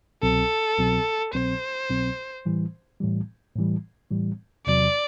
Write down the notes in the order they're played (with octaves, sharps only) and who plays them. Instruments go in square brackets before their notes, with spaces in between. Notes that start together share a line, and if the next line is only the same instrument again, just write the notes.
[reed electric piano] C2 B2 F#3 C4 [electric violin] A4
[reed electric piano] C2 B2 F#3 C4
[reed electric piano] C2 B2 F#3 C4 [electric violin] C5
[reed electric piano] C2 B2 F#3 C4
A2 E3 G3
A2 E3 G3
A2 E3 G3
A2 E3 G3
[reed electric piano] E2 C3 F#3 [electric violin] D5